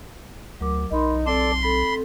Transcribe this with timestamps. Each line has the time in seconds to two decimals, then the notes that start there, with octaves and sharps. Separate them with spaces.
0.61 D2 F#3 A#4 D6
0.92 B1 D#4 A#4 B5 C6
1.26 C4 A4 D5 C6
1.63 C4 A4 B5